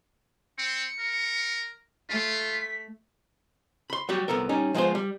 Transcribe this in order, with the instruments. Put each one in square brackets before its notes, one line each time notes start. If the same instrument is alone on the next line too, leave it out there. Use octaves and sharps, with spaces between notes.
[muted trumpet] C4 [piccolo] C#7
[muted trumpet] A#4
[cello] A3 [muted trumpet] F4 [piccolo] B6
[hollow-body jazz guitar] B5 C6
F#3 G3 F#4 G4
C2 F2 B3 A4 A#4
G3 C#4 D#4
F3 G#3 B3 D#4 F4 C5
G3